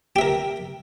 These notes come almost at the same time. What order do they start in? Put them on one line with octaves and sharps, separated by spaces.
G4 E5 A#4